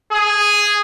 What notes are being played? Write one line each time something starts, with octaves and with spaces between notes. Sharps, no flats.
G#4